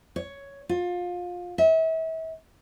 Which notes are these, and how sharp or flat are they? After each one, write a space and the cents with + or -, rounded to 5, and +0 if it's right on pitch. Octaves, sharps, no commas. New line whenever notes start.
C#5 +5
F4 +25
E5 -35